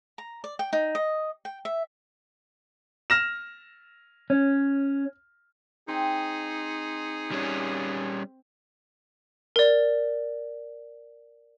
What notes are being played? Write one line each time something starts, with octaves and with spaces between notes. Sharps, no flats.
A#5
D5
G5
D#4
D#5
G5
E5
F6 A#6 E7
C#4
C4 D#4 G#4
G3 C#4
A#4 D5